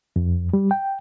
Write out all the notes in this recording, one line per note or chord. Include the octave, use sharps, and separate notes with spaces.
F2
G3
G5